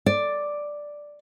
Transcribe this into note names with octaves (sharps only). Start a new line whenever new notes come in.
D5